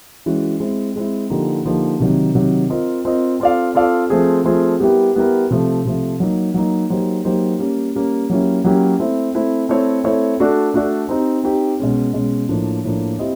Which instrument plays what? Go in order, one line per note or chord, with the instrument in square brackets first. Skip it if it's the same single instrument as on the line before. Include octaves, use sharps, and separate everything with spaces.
[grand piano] E3 G#3 C#4 F#4
G#3 C4 E4
G#3 C4 E4
D3 F3 A#3 D#4 G4
D3 F3 A#3 D#4 G4
C3 D#3 F#3
C3 D#3 F#3
C4 F4 A#4 D#5
C4 F4 A#4 D#5
C4 F4 A4 D5 F5
C4 F4 A4 D5 F5
F3 A3 C4 F4 G#4
F3 A3 C4 F4 G#4
G3 B3 E4 G4 A#4
G3 B3 E4 G4 A#4
C3 F3 A3
C3 F3 A3
F#3 A#3 D#4
F#3 A#3 D#4
F#3 A#3 D#4 G4 C5
F#3 A#3 D#4 G4 C5
G3 A#3 C#4
G3 A#3 C#4
F#3 A#3 C#4 E4 G4
F#3 A#3 C#4 E4 G4
A3 C4 E4
A3 C4 E4
A3 C4 E4 A4 C#5
A3 C4 E4 A4 C#5
A3 D4 F#4 A4 D5
A3 D4 F#4 A4 D5
C4 D#4 G4
C4 D#4 G4
B2 G#3 C#4
B2 G#3 C#4
A2 F3 A#3 D4
A2 F3 A#3 D4
C4 E4 G4 C5 D#5